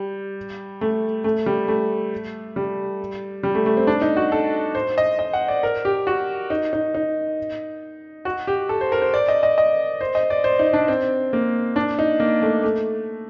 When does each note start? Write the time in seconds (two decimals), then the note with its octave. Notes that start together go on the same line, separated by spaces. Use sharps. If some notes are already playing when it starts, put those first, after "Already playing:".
Already playing: G3
0.81 A3
1.24 A3
1.46 G3
1.68 A3
2.56 G3
3.43 G3
3.55 A3
3.66 A3
3.77 C4
3.87 D4
4.01 D#4
4.17 F#4
4.32 A4
4.75 C5
4.98 D#5
5.19 D#5
5.33 F#5
5.48 D5
5.63 A#4
5.85 G4
6.07 F#4
6.50 D#4
6.73 D#4
6.95 D#4
8.25 F#4
8.47 G4
8.69 A4
8.81 C5
8.92 A#4
9.02 C5
9.14 D5
9.28 D#5
9.43 D#5
9.58 D#5
10.01 C5
10.15 D#5
10.30 D5
10.44 C5
10.59 D#4
10.73 D4
10.88 C4
11.33 A#3
11.76 D4
11.99 D#4
12.20 A#3
12.42 A3
12.63 A3